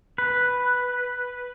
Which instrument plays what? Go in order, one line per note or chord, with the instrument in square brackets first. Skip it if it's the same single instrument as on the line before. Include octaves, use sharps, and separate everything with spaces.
[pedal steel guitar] B4